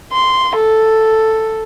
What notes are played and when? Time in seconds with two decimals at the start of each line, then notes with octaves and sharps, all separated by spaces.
0.13 C6
0.56 A4